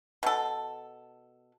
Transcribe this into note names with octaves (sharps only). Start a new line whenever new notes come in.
B2 A4